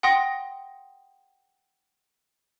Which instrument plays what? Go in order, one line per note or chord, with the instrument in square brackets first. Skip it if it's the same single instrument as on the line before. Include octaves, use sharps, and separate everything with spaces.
[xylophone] F#5 G5 C6 D#6 A#6